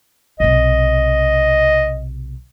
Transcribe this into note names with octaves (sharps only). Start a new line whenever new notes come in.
B1 C3 D#5